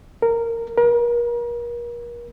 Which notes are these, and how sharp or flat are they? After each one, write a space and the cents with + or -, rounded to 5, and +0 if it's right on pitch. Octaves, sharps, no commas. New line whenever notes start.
A#4 -15
A#4 +35